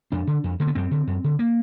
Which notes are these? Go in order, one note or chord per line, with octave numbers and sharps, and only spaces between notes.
F2 D4
D3
F2
D3 A#3
B3
F#2 C4
D3
F#2
D3
A#3